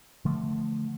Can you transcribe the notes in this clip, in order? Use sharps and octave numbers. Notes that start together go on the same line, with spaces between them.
D3 F3 A3